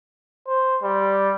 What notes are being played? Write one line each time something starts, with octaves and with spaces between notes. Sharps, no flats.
C5
G3